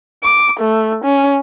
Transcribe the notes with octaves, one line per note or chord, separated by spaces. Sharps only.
D6
A3
C#4